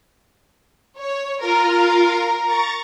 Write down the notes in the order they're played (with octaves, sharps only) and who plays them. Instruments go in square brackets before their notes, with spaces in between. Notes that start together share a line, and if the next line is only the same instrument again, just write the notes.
[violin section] C#5
[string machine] F4 F5 [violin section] A#4
[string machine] A#5 C#6 A6